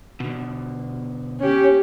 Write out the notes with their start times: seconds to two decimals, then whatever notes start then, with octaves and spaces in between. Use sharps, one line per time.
0.20 B2 D3
1.40 C#4 G4